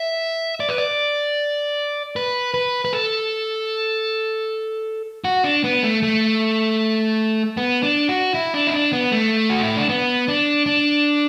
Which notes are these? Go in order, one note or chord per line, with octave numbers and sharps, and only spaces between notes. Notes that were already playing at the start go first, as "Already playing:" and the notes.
Already playing: E5
D5
B4
D5
B4
B4
B4
A4
F#4
D4
B3
A3
A3
B3
D4
F#4
E4
D4
E4
D4
B3
A3
F#4
E4
D4
B3
D4
D4